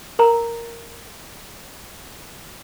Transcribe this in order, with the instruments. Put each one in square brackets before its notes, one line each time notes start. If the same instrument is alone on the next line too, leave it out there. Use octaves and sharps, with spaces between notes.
[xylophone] A#4 A#5